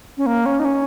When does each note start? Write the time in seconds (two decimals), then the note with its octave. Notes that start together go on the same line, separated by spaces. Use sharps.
0.17 C#4
0.26 A#3
0.46 C#4
0.59 D#4
0.65 C#4